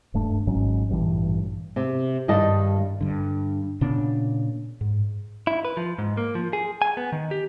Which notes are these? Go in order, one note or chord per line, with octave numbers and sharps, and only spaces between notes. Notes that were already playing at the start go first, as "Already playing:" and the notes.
D#1 G2 A3 D4
G#1 G#2 F#3 C#4
A1 G2 A#2 E3
C3
G2 D#3 D#5 A5
G2 D3
A#2 C#3 B3 D4
G#2
E4
B4
F3
G#2
A#3
F3
G#4
G#5
B3
D#3
G4